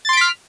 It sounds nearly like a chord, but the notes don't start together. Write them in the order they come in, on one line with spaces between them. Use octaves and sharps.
A6 C6 D7 B6 F6